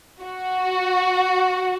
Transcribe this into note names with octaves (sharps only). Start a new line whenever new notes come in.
F#4